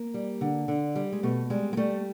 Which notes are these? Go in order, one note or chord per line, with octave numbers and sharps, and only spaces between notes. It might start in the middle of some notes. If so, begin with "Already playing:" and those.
Already playing: A#3
G3
D3
D3
G3
G#3
B2 A3
G3 G#3
G#3
G3 A3